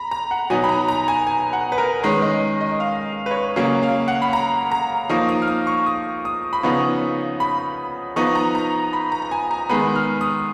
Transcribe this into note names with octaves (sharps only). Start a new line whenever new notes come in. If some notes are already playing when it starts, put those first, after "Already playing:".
Already playing: A#5 B5
A#5
F#5
B2 F#3 B3 D#4 G#5
B5
A#5
A#5
G#5
G#5
F#5
B4
A#4
D#3 G#3 C#4 B4
D#5
D#5
F5
B4
C#5
C#3 F#3 A#3 C#4
F5
F#5
B5
A#5
A#5
F3 A#3 D#4 C#6
D#6
F6
D#6
C#6
D#6
D#6
B5
C#3 F3 B3 D#4 C#6
B5
F3 B3 D#4 C#6
A#5
A#5
B5
A#5
A#5
G#5
A#5
D#3 G#3 B3 B5
F6
D#6